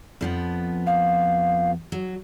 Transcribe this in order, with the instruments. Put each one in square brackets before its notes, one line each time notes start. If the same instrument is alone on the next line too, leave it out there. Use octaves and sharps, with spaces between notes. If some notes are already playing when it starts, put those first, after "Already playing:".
[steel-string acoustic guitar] F2 F3 B3
[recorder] F5
[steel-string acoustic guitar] F#3